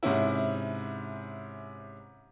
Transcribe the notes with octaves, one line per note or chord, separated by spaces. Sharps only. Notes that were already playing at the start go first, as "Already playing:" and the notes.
G#2 C3 C#4 E4